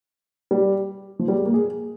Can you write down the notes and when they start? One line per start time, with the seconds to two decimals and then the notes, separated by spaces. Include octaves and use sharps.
0.51 G3
1.19 F3
1.28 G3
1.37 G#3
1.45 A#3
1.54 G#4